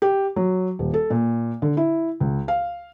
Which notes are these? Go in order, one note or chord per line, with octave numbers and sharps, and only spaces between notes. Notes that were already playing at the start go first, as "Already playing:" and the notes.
G4
F#3
D#1
A4
A#2
D3
E4
C#2
F5